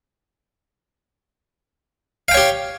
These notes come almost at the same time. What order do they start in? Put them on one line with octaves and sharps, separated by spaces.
F5 G5 C#5 G4